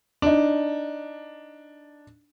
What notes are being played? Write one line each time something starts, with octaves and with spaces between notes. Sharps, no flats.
D4 D#4